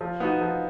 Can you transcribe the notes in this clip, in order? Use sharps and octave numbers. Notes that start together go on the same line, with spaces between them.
F3
B3 D#4 F#4
F3